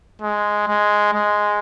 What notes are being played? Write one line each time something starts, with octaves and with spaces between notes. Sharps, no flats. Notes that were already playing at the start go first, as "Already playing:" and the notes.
G#3
G#3
G#3